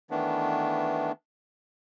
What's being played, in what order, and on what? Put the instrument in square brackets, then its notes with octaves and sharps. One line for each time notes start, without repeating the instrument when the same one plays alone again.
[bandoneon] D#3 E3 A3 B3 D4